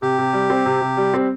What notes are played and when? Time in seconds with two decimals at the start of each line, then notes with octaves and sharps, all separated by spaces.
0.02 C3 G4
0.18 C3
0.33 G3
0.50 C4
0.66 C3
0.81 C3
0.97 G3
1.14 C4